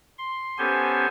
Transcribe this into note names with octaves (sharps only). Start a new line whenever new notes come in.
C6
B3 C#4 G4 A4 C5 G#5